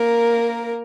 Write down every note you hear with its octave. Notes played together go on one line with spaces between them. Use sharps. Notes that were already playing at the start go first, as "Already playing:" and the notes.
Already playing: A#3 A#4